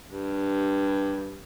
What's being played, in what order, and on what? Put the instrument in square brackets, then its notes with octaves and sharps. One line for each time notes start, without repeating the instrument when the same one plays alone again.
[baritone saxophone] G2